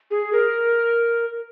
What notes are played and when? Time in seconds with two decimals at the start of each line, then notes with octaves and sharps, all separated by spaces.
0.11 G#4
0.33 A#4